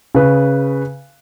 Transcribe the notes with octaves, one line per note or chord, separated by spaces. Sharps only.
C#3 B4